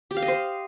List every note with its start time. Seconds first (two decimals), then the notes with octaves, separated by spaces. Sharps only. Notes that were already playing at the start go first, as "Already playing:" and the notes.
0.11 G4
0.17 F5
0.22 D#5
0.28 C5